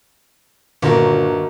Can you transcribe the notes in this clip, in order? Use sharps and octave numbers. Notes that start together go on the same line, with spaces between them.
G1 D#2 A#2 D3 F#4 A#4